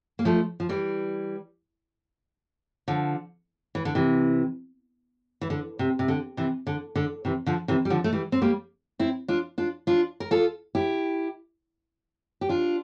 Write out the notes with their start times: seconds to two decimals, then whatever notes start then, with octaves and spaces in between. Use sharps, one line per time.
0.19 A#3
0.25 F3 A3
0.60 F3
0.69 E3 G3
2.88 D3 F3
3.75 E3
3.85 D3
3.95 C3 E3
5.41 E3
5.50 D3
5.79 C3
5.99 C3
6.08 D3
6.37 C3 E3
6.67 D3
6.95 D3
7.25 C3 E3
7.46 D3 F3
7.68 C3 E3
7.85 G3
7.90 D3 F3
8.04 A3
8.13 E3 G3
8.32 C4
8.42 G3 A#3
8.99 C4 E4
9.28 D4 F4
9.58 D4 F4
9.87 D4 F4
10.20 A#4
10.31 F4 A4
10.75 E4 G4
12.41 G4
12.49 D4 F4